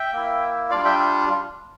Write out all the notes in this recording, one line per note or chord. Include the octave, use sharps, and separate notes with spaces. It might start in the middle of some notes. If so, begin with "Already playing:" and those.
Already playing: E5 G5
A#3 E4
G3 D4 F4 D5 F5
E5 G5